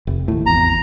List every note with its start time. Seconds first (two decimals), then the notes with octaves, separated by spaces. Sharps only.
0.07 F1
0.28 D#2 A2
0.46 G#1 E2 A#5